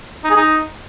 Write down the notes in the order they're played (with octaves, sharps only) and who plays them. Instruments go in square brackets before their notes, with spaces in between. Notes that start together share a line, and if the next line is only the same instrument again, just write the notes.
[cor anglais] D#4
G#4
D#4